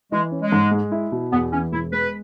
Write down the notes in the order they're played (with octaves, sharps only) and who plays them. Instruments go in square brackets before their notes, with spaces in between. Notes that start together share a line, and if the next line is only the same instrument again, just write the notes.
[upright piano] E3 [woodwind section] G#3
[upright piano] C#4
[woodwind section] G#3
[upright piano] G#2
G#3
E4
B2
[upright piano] E2 [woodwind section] B3
[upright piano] E3 [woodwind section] C#4
[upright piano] E1 [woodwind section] E4
[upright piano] G#3 [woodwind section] B4